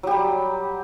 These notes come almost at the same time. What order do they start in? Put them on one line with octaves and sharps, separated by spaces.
F#3 G4 G3